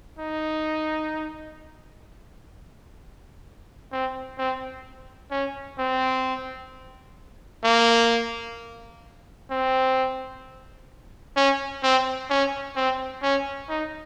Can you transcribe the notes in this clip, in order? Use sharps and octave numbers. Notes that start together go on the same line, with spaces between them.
D#4
C4
C4
C#4
C4
A#3
C4
C#4
C4
C#4
C4
C#4
D#4